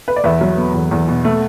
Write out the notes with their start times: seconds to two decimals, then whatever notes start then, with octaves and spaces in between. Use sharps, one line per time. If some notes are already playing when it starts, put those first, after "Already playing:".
0.08 B4
0.16 D5
0.24 E2 B4 E5
0.41 F#3
0.57 B3
0.74 E2
0.91 E2
1.08 B2
1.24 A3